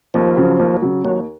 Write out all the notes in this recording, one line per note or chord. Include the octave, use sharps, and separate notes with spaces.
D#2 F3
C#3 F#3
D#2
C#3 F#3
D#2 F#3